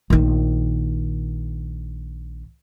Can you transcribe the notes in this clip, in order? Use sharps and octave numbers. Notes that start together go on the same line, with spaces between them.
A#1 D#3